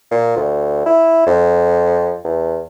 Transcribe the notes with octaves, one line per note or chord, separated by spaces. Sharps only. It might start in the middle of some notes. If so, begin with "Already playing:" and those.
A#2
D2
E4
F2
E2